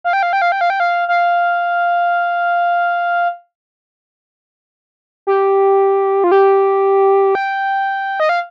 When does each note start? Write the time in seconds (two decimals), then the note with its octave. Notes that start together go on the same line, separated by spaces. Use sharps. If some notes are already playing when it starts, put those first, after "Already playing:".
0.04 F5
0.13 G5
0.23 F5
0.33 G5
0.42 F5
0.52 G5
0.61 F5
0.70 G5
0.80 F5
1.08 F5
5.27 G4
6.24 F4
6.32 G4
7.35 G5
8.20 D#5
8.29 F5